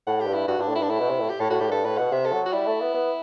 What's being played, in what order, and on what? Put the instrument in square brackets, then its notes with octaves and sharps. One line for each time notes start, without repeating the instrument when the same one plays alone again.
[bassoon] A2 [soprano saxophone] F#5
[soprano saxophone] G4
[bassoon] G2
[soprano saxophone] E4
[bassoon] G2 [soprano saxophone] F#4
[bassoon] G2 [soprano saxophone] D4
[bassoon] A2
[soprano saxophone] E4
[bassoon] G2
[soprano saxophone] D4
[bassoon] A2 [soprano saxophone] E4
[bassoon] B2
C3
A2
[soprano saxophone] G4
[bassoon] A2 [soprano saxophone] A4
[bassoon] A2 [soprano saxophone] F#4
[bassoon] A2 [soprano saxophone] G4
[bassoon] G2 [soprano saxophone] A4
[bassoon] A2 [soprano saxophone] B4
[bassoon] B2 [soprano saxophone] F#5
[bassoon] C3 [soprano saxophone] E5
[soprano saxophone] A4
[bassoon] F#3
[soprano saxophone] F#4
[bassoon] G3 [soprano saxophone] E4
[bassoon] A3
B3
B3